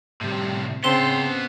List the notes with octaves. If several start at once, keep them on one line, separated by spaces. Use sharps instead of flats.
A2 C3 G3
C#3 B3 C4 A5 C6